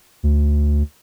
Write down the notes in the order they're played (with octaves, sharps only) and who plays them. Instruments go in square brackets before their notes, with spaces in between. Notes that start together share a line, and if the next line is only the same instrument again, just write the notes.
[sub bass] D2